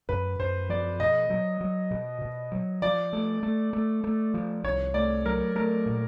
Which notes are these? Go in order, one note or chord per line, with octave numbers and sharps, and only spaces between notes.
F#2 B4
F#2 C5
F3 D5
B2 D#5
F#3
F#3
B2
B2
F#3
F3 D5
A3
A3
A3
A3
F3
C2 C#5
A3 D5
F#3 A#4
A3 A#4
A#2